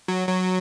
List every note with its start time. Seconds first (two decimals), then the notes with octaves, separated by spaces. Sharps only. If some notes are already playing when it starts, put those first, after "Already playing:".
0.08 F#3
0.28 F#3